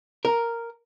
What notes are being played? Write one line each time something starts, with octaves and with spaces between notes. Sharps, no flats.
A#4